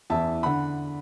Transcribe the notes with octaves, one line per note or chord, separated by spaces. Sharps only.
E2 E3 E5 A5
D3 F#5 B5